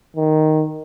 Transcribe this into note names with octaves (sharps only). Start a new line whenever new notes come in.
D#3